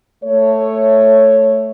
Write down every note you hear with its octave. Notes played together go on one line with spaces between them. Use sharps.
A3 C#5